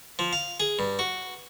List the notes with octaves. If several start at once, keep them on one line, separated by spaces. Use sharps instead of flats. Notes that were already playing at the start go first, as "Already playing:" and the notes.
F3
F5
G#4
G2
F#4